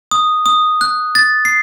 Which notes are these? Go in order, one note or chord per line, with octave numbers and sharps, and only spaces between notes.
D#6
D#6
F#6
A6
C7